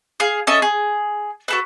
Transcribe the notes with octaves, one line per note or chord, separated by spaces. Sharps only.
G#4 F5
C#4 A4 D#5 E5
G#4
F#4 A4 B4